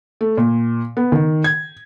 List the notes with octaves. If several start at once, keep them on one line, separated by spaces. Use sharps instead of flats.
A3
A#2
B3
D#3
G#6